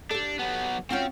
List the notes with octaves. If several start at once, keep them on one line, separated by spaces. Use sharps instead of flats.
D4 G4 A4
F#3 B3
C4 C#4 F4 F#4 G5